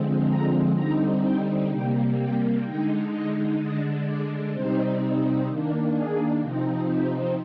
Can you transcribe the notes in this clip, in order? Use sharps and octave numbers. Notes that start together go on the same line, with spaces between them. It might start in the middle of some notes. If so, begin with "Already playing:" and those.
Already playing: D3 F3 G#3 C4
A#5
D3 G3 C4 D#4 A#5
G5
C3 G3 A#3 G5
G5
D3 G#3 D#4 G5
D#5
D3 G#3 D4 D#5
D5
C3 G3 C4 D#4 C5
D#3 A#3 D4
G#4
C3 F3 C4 D#4
G4